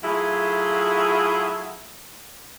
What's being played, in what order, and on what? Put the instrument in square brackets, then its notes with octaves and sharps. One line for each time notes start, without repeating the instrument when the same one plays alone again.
[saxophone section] F#3 A3 E4 F4 G#4